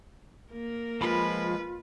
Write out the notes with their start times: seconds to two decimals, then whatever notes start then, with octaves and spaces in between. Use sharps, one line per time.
0.52 A#3 A#4
1.01 F3 G#3 F4 B4 B5